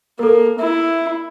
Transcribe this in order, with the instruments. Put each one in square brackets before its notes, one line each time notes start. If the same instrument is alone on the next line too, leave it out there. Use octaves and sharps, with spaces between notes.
[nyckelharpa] A#3 [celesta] A4 A#4
[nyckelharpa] E4 [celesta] E5